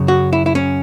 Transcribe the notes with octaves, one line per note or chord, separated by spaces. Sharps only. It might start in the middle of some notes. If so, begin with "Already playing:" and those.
Already playing: F#2 C#3 F#3
F#4
E4
E4
C#4